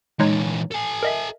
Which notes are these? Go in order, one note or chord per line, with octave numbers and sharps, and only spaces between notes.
E2 A#2 G#3 D#4 C#5
A4 G#5
A#4 D#5 E5